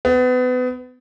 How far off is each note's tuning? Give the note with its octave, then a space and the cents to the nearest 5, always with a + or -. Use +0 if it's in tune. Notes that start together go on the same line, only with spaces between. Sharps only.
B3 +30